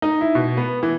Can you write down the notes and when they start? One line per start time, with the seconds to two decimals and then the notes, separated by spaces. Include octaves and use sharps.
0.02 D#4
0.21 E4
0.35 B2
0.57 B3
0.83 E3